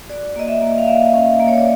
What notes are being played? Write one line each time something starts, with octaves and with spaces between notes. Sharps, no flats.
F#4 D5
A#3 D#5
E5
A#3
F5
A#3 E5
C#4
A#3
C#5
D5